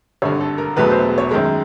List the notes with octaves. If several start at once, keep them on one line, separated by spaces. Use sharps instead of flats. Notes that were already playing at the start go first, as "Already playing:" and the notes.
G#1 G2 D3 C#5
A4
A#4
E1 E2 B2 F#3 A3 B4
C5
C#5
F#2 D#3 G#3 A#4